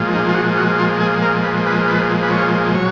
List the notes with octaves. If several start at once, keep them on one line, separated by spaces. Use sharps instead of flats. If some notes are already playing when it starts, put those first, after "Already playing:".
Already playing: A#2 F3 G#3
D#4
F4
F#4
F#4
F4
G#4
A#4
B4
B4
B4
B4
C#5
F#3 C#5